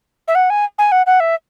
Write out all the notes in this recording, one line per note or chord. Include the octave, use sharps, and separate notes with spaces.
E5
F#5
G#5
G#5
F#5
F#5
E5